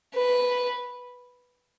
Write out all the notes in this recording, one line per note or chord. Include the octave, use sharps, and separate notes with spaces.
B4